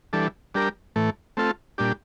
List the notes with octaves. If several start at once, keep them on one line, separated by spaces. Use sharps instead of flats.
E3 G3 D4 A4
G3 D4 G4 A#4
A2 E3 A3
A3 C4 F4 A4
A#2 G3 D4 G4